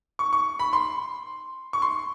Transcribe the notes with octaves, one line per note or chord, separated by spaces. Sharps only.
C#6
C#6
B5
C6
C#6
C6